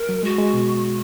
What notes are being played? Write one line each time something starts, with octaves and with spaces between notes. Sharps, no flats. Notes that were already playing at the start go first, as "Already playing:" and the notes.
Already playing: A#4
F#3
G#3 F#4
G#3
B2